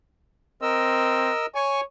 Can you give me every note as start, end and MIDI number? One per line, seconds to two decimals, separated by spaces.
0.62 1.31 60
0.62 1.46 70
0.62 1.46 75
0.62 1.46 88
1.55 1.83 73
1.55 1.81 80
1.55 1.81 85